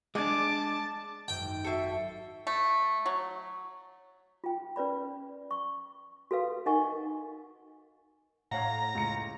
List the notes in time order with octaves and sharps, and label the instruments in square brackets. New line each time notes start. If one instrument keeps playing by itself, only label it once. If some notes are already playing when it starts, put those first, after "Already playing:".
[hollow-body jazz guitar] G#3 D4 [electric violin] A5 [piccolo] D6
[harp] G#1 F#2 [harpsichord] G5
[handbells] F#4 C#7 [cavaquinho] A4 E5
[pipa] A3
F#3
[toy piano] F4 G5
C#4 B4 D5 B5
C#6
F#4 A4 B4 F5
D#4 A#4 D#5 F#5 G#5 C#6
[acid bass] A2 [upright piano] C#5 F5 F#5 [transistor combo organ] A#5
[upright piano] C#2 C#7